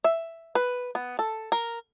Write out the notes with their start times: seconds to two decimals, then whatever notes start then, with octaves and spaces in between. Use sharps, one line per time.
0.04 E5
0.55 B4
0.95 B3
1.19 A4
1.52 A#4